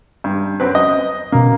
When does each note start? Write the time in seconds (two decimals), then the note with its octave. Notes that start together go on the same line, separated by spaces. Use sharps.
0.24 G2
0.60 F#2 C4 B4
0.75 D#5
1.32 B2 A#3 C#4